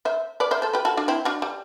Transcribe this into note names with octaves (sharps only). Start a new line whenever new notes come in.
C5 E5
B4 D5
C5 E5
A4 C5
G4 B4
F#4 A4
D4 F#4
C4 E4
D4 F#4
G3